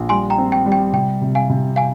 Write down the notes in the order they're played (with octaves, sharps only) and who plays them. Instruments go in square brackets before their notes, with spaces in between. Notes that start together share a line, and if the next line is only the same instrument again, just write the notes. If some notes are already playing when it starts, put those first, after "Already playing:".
Already playing: [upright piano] A#1
[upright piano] G3 [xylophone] G#5 C6
[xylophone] G5 A#5
[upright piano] C4
[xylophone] G5
[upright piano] G3
[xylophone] G5
[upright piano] C3 [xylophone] G5
[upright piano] C3
[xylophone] F5 G#5
[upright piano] C3
[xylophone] F5 G#5